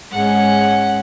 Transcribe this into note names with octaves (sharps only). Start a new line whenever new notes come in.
G#2 G#3 C#4 F#5